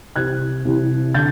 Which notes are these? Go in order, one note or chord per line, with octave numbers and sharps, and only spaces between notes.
C2 C3 E3 F#6 G#6
C2 C3 E3
D3 G6 A6